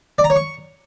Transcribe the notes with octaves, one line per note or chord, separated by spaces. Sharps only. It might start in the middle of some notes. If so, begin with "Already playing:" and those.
D5
A#5
C#5
C#6